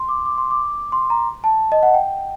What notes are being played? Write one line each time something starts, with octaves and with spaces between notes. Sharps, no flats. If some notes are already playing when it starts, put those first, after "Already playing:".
Already playing: C6
D6
D6
C6
D6
C6
A#5
A5
D#5
F#5
G5